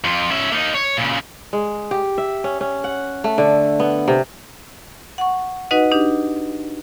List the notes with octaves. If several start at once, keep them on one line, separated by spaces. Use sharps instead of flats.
F2 F4
C#4 E5
A#3 D#4
C#5
A#2 C#3
G#3
G4
E5
C#4
C#4
F#5
A3
D3
B3
C3
F#5 C#6
D#4 F#4 B4 D#5 F#5
D4 D#4 G4